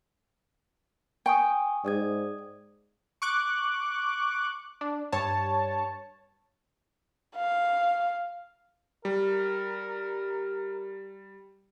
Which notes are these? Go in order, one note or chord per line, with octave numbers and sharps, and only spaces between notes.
G5 G#5 C#6 D#6
G#2 D5 D#6 G#6
C#6 D6 F#6
D4
G2 C#5 A5
F5
G3 A#4